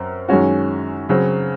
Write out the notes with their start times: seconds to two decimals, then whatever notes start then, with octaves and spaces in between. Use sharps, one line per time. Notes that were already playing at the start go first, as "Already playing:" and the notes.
Already playing: F#2 C4 A#4
0.28 F#2 D#3 G#3 C#4 F#4
1.09 C#3 F#3 C4